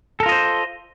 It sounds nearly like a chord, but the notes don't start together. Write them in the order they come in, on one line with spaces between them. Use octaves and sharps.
A4 A#4 F4 D#5 C5